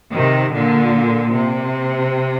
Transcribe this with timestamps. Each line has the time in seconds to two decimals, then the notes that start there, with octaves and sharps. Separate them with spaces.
0.14 C3 D#3
0.54 A#2 D3
1.35 C3